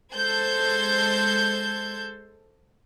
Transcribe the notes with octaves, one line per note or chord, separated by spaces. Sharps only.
G#3 A4 C5 G6 G#6